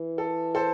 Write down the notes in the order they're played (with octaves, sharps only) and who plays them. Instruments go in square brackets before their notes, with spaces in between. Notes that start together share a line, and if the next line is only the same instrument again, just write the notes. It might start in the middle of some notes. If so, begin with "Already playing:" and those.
Already playing: [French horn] E3
[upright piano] A4
A4 C5